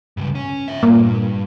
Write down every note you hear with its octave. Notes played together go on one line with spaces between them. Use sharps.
C#2 G2
C#4
C#5 E5
G2 A#2